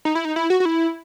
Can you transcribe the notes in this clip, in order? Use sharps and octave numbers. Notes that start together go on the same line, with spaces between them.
D#4
E4
D#4
E4
F#4
F#4
E4